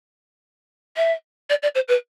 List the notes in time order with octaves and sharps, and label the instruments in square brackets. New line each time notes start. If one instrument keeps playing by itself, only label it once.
[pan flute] E5
D5
D5
C5
B4